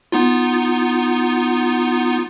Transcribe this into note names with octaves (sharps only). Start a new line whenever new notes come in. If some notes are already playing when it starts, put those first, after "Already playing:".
B3 D#4 F4